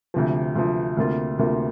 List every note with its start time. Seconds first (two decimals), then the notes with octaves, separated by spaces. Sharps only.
0.14 D2 C3 F3
0.55 D2 C3 F3
0.97 D2 C3 A#3 F4
1.39 D2 C3 A#3 F4